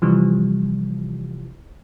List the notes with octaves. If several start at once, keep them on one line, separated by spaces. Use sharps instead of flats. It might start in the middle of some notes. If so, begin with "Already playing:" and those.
C3 E3 F3 G3